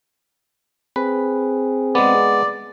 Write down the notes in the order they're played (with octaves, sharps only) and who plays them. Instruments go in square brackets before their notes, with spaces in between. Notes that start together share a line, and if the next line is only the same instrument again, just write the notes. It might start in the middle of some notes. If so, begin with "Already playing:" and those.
[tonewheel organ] C4 G#4 [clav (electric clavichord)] B4
[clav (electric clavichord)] G#3 B3 [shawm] D5